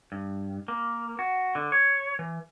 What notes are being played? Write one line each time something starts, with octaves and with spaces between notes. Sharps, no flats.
G2
A#3
F#4
D3
C#5
E3